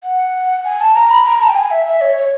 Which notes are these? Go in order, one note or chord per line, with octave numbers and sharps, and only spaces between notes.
F#5
G#5
A5
A#5
B5
A#5
A5
G5
G#5
E5
E5
C#5
C#5